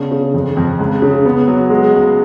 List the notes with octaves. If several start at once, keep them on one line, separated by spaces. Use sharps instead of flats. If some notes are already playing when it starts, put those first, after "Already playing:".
Already playing: C#3 B3 D4
C#3
F2
F2
C#2
C#3
B3
F#3
G#3
C#2